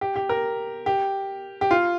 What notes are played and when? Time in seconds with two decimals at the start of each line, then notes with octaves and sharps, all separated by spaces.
0.01 G4
0.16 G4
0.29 A#4
0.86 G4
1.61 G4
1.71 F4